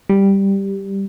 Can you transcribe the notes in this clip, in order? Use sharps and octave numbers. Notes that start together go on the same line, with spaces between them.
G3